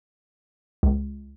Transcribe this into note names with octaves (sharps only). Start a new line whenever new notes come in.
C#2